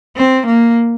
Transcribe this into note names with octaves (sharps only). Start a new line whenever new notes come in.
C4
A#3